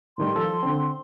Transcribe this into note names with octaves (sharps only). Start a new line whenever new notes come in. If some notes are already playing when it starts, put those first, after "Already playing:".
A2 D#3 G3 C6
F3 A4
D3 C4